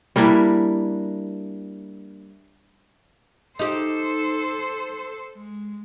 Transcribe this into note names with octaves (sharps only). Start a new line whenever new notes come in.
G3 A#3 D4 E4
D#4 G4 A4 C5
G#3